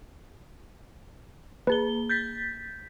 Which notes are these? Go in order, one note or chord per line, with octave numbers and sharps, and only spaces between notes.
A#3 G#4 B4 G7
G6 A6 B6